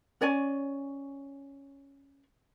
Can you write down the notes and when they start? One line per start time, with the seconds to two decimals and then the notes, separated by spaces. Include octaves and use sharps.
0.21 C#4 C#5 D5 G#5